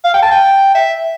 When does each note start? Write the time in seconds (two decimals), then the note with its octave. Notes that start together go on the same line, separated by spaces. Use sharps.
0.05 F5
0.14 G5
0.22 A5
0.31 G5
0.74 E5